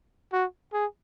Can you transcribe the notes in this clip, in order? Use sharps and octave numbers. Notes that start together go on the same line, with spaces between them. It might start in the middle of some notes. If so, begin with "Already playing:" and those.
F#4
G#4